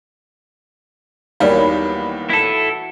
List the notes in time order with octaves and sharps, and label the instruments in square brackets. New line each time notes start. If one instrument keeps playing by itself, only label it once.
[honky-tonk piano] D#2 D#3 G3 [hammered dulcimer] E3 F#3 B3 [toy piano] D5 F5
[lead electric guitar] E4 A4